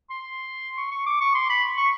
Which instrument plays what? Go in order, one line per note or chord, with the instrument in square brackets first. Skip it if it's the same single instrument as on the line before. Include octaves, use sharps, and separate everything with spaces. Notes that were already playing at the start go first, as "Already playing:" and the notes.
[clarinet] C6
C#6
C#6
D6
C#6
C6
B5
C#6